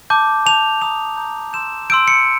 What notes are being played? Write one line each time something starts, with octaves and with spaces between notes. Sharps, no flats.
A5 D6 G6
A5 D6 G6 F7
A#5 D#6 G6 F7
A#5 D#6 G6
C6 E6 G6 E7
C6 E6 G6 D7
C#7